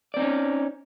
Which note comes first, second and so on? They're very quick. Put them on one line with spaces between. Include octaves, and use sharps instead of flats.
D5 C4 D#4 C#4